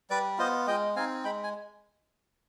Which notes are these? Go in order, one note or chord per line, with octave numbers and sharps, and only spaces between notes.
G3 B4 D5
B3 F4 C5 D#5
G#3 D#5 G5
C4 D#4 F5 G#5
G#3 G5 B5
G#5